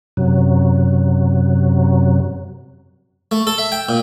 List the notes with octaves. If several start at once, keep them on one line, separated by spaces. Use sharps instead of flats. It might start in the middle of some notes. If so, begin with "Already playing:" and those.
F#2 C3 F#3
A3
A4
E5
G5
A#2